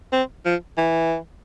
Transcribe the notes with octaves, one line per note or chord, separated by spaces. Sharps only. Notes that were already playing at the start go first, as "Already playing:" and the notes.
C4
F3
E3